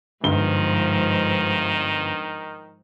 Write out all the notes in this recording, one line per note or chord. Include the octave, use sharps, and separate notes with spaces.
G1 G#2 D#3 F3 G7